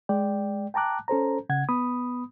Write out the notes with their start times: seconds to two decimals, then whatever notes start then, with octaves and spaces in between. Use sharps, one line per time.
0.09 G#3 D5 G5
0.74 G5 A5 A#5 D6 F#6
1.08 C#4 A4 C5 A#5
1.49 C#3 F#5 G#6
1.69 B3 B5 D#6